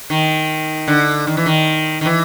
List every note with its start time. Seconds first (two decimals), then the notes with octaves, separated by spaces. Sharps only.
0.10 D#3
0.88 D3
1.27 D#3
1.37 E3
1.46 D#3
2.01 D#3
2.06 E3